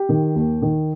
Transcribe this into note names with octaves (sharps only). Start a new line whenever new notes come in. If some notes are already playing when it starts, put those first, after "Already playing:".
Already playing: G4
D#3
D#2
D#3